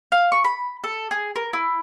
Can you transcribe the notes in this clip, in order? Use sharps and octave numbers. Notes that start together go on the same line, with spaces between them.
F5
C#6
B5
A4
G#4
A#4
E4